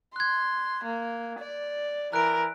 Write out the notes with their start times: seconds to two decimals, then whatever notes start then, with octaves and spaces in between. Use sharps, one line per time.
0.16 C6 F#6 G#6
0.84 A#3
1.39 D5
2.13 E3 A#4 F#6 D7